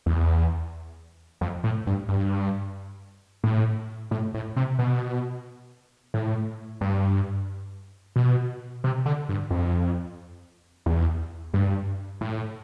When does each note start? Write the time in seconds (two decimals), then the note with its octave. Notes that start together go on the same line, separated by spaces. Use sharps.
0.06 E2
1.41 F2
1.64 A2
1.87 G2
2.09 G2
3.44 A2
4.11 A2
4.34 A2
4.56 C3
4.79 B2
6.14 A2
6.81 G2
8.16 B2
8.84 C3
9.06 D3
9.29 G2
9.50 F2
10.86 E2
11.54 G2
12.21 A2